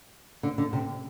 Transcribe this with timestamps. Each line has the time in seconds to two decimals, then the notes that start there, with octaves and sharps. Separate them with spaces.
0.43 D3
0.58 D3
0.73 C3